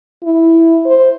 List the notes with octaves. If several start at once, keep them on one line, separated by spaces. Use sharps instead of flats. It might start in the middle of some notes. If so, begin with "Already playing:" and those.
E4
C5